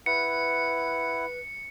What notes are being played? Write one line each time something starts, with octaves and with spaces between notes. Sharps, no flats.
E4 B4 F#5 C#7